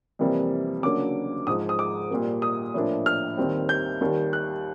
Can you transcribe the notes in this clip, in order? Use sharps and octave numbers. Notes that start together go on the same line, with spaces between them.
F2 C3 E3 G3 A#3
D2 C#3 F#3 A#3 D4 D6
G#2 F3 G#3 D#6
D#6
D6
A#2 G3 A#3
D#6
A2 F3 A#3 D4
F6
D#2 D#3 G3 C4
G6
D#2 D#3 G3
F#6